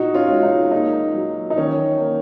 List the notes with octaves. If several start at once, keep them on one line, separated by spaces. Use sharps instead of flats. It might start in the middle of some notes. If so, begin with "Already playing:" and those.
Already playing: A#2 D#4 F#4
C#4 F4
G#3
D#4
A#3 D#4
F#3
D#4
D#3 C#4
A#3